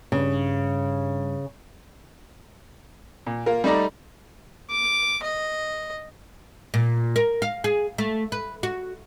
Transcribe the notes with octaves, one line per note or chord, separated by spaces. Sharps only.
G2 C#3
A#2
A#3 F4 A#4
G3 A3 D#4 D5 A#5
D6
D#5
A#2
A#4
F5
G#4
A3
B4
F#4